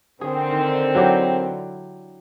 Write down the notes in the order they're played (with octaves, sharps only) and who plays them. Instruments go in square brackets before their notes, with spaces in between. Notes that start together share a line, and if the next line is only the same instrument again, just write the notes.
[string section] D3 [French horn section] C4 A#4 [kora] G#4
[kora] D#3
F#3 E4 G4